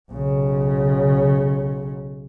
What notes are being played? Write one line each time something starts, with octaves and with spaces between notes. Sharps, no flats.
B1 C#3